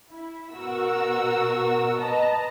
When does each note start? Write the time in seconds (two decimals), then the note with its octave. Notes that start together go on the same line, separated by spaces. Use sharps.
0.11 E4
0.52 B2 F#4 A#4 E6
2.00 B4 D#5 A5 A#5